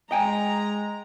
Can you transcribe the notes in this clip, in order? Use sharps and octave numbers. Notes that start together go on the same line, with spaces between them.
G#3 D#5 G5 G#5 A#5